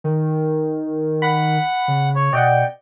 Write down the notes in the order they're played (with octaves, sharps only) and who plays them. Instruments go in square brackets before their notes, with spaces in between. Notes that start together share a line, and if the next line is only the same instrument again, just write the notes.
[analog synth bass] D#3
[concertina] F#5 [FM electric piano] B5
[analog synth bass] C#3
[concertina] C#5
[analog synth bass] B2 [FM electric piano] D5 D#5 F#5 [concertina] G5